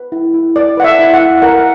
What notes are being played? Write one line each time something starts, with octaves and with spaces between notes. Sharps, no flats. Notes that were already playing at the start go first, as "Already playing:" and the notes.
Already playing: B4
E4
E4
B4 D5
B4 F#5
E5
E4
F#5
E4
A#4 F#5